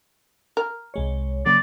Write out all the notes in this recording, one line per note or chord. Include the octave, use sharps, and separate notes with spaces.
A#4
C2 G#3 C#5
C#3 F#3 A#3 D5